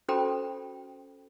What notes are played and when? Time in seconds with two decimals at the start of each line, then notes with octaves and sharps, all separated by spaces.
0.09 C#4 F#4 A4 C5 G5 B5